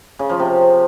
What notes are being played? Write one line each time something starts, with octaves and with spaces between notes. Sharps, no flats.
C#3
F3
C3